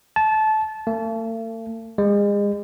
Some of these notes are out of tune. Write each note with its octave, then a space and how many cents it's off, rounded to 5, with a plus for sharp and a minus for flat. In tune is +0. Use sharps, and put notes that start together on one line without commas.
A5 -20
A3 +45
G#3 -35